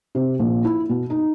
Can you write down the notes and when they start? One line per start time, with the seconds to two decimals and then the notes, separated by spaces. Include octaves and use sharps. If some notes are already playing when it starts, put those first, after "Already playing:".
0.15 C3
0.39 A#1
0.64 E4
0.89 B2
1.10 D#4